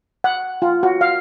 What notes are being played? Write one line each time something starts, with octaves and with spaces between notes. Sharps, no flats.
F#5
F4
F#4
F5